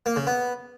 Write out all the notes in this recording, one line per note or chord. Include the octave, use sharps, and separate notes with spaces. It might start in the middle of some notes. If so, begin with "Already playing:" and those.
A#3
C#3
B3